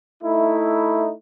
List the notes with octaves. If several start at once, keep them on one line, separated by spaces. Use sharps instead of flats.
A3 D#4 E4